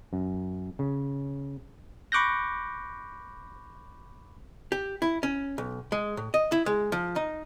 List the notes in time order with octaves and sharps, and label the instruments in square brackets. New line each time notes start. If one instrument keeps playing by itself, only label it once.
[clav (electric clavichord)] F#2
C#3
[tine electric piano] B5 C#6 D6 F#6 G6 A#6
[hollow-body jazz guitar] G4
E4
C#4
B1
G#3
A2
D#5
E4
G#3
F3
D#4